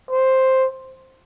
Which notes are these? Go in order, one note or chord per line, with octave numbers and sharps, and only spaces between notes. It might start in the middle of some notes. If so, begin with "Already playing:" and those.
C5